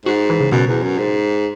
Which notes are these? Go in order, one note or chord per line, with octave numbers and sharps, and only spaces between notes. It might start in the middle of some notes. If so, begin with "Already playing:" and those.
G#2 F#4
E3
C#3
F#2 B2
E2
F#2
G#2